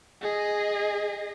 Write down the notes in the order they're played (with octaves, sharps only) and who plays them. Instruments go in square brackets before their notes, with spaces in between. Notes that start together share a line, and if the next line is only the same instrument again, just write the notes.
[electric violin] G#4 D#5